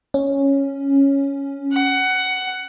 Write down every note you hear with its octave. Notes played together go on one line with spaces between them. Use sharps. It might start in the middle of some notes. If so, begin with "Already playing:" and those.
C#4
F#5